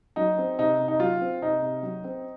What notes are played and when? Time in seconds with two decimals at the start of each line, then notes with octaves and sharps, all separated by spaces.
0.16 F#3 D#4
0.38 C4
0.59 C3 D#4
0.80 C3
0.88 D#4
1.00 F#3 F4
1.21 C4
1.42 C3 D#4
1.62 C3
1.83 F#3
2.04 C4